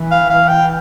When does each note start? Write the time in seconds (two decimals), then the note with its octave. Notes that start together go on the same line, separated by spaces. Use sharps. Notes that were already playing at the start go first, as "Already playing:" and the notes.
Already playing: E3
0.11 F5
0.30 F5
0.48 G5